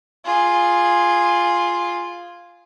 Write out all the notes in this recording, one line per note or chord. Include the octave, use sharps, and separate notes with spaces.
F4 G#4